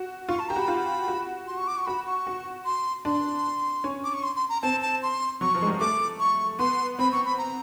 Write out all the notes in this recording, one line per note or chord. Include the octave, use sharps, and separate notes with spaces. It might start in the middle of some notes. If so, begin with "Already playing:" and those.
Already playing: F#4
F4 C#6
A5
G4 A#5
F#4
B5
F4
F#4
C6
C#6
D6
C#6
F#4 B5
C#6
F#4
C6
D4 C6
C#4
D6
C#6
C6
C6
A#5
C4 A5
A5
C6
F#3 C#6
F3
G#3
G3
A3 D6
C#6
B3 C6
C4 B5
C#6
B5
A#5